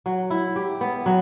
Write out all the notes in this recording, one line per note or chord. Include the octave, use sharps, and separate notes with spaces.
F#3
E4
G4
B3
F#3